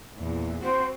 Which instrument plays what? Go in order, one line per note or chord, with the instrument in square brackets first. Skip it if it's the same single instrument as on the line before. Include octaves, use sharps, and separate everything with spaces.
[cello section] E2 A#2
[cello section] C4 F#4 [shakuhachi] C5